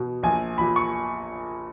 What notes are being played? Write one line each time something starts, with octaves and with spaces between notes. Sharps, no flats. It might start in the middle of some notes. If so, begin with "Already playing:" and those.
Already playing: B2
A#1 A#2 G#5
A#1 A#2 B5
C#6